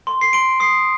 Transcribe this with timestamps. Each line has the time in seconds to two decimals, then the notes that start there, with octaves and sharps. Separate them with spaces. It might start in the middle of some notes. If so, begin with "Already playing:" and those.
0.07 C6
0.21 C7
0.33 C6 D7
0.60 D#6 C7